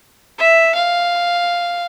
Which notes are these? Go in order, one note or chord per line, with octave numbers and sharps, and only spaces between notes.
E5
F5